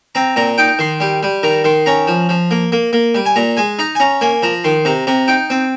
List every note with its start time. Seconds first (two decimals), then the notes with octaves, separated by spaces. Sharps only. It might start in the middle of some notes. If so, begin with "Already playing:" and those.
0.15 C4 A#5
0.36 A#2 A#5
0.58 D#4 G5
0.79 D#3 C6
1.00 G3
1.23 G3
1.43 D#3 A#5
1.64 D#3 C6
1.86 C#4 A#5
2.07 F3
2.29 F3
2.51 A#3
2.72 A#3
2.93 A#3
3.15 G3
3.26 G#5
3.36 A#2 A#5
3.57 G#3 G#5
3.79 D#4 A#5
3.95 G#5
4.00 C#4 A#5
4.21 A#3 G#5
4.43 F3 A#5
4.64 D#3 C6
4.85 C3 A#5
5.07 C3 A#5
5.28 D#4 G5
5.50 C4